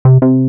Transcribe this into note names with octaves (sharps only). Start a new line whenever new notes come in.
C3
C3